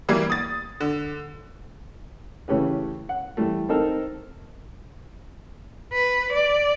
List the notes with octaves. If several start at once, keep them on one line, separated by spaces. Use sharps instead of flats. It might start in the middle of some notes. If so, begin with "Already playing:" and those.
E3 G3 A#3
D#6 A6
D3
C#3 E3 A3 C#4 G4 B4
F#5
E3 G3 A3
C4 D#4 A4 A#4
B4
D5